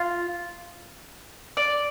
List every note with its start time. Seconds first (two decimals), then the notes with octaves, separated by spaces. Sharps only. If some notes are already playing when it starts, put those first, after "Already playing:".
Already playing: F4
1.57 D5